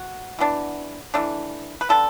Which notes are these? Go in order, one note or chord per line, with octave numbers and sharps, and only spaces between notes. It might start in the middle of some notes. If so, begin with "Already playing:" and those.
Already playing: F#4
E3 B3 D4
E3 A3 D4
B4
D3 B3 D4 A4